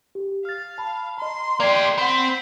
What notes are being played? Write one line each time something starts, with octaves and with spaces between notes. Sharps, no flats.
G4
F5 F6 A6
A5 B5
D#5 A#5 C6
A#3 G4 D5 G#6 C7
C4 F#5 B5 C7